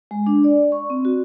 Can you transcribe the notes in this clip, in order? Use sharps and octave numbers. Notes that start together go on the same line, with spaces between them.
G#3
D4
D5
C#6
C4
F#4